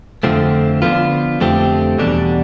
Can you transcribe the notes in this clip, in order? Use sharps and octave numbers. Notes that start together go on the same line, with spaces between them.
F2 D3 F3 A3 C4
D3 F3 B3 F4
F2 D3 A3 C4 G4
E2 B2 G3 D4